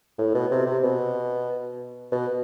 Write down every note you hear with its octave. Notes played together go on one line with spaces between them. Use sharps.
A2
B2
C3
C3
B2
B2